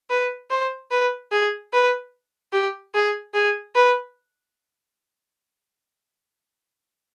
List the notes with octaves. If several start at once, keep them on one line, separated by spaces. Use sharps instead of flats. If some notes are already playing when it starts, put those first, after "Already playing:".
B4
C5
B4
G#4
B4
G4
G#4
G#4
B4